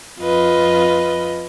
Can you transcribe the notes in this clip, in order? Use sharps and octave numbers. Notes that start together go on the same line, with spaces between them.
F2 F4 B4 D#5